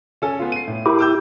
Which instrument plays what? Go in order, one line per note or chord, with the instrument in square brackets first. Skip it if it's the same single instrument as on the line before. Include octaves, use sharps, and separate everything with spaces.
[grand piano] C#4 A4 G#5
B3 F4
C7 D#7
A2
[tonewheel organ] E4 G4 [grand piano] A#4
[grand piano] D6 E6 G6